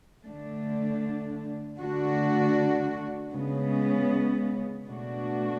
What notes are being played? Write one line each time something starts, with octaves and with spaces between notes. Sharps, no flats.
D3 A3 D4
D3 A3 D4 F#4
C#3 G#3 B3
B2 A3 D4 F#4